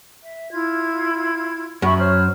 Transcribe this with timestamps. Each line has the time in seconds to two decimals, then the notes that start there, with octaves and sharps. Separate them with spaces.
0.22 E5
0.52 E4 F4 G#6
1.82 F#2 E5 B5 C#6
1.98 C5 C#5 F6